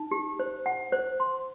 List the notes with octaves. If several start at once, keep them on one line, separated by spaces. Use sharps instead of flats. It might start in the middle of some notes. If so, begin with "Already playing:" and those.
Already playing: D#4
G4
C5
F#5
C5
C6